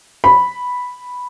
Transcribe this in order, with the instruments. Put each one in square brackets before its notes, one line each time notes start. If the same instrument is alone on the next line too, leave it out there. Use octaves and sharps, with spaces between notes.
[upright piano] B5